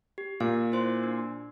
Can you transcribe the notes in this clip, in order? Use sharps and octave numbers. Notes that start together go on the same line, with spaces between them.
G4
A#2 F5
E4 C5 C6
D4